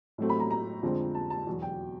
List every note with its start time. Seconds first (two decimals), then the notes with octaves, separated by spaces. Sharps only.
0.18 A2 F#3 A3 C4
0.30 B5
0.40 A#5
0.51 A#5
0.83 F2 D3 F3 G#3 C4
1.15 A5
1.30 A5
1.47 E2 B2 F#3
1.62 G5